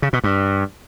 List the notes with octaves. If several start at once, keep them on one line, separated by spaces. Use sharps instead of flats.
C#3
B2
G2